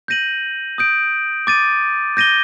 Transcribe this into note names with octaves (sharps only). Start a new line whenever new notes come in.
G6 A#6 D#7 F#7
D#6 G6 D7
D6 A6 D#7
G6 A#6 D#7 G7